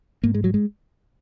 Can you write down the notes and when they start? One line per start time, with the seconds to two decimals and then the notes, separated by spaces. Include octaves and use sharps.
0.23 G#2 A#3
0.34 G#3
0.44 F#3
0.54 G#3